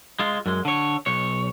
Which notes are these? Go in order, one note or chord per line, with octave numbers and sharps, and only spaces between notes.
G#3 F4
F#2 G#3
D3 C#5
B1 C#5